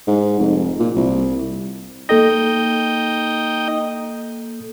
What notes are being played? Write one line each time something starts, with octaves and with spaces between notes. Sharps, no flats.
G#2
F1
A#2
C2
A#3 D#4 A4 D#5 G5 A#6